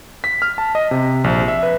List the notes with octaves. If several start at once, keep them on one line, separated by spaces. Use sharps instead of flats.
B6
F6
A5
D#5
C3
A#1
E5
B4